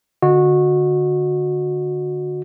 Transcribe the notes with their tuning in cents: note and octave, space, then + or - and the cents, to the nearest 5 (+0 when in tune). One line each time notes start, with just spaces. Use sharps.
D3 +0 F#4 -20 D#5 -10